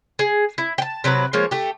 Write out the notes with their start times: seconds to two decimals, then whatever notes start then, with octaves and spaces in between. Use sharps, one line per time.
0.19 G#4
0.58 E4
0.78 G5 A5
1.04 C3 F#3 E4 B4
1.33 F3 G#3 A#3 C#5
1.51 A3 G4